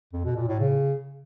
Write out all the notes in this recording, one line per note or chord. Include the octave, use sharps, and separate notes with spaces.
F2
B2
A#2
A2
C#3